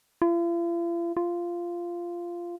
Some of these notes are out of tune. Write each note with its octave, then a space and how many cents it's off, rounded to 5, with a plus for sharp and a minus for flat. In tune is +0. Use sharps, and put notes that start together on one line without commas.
F4 -45
F4 -10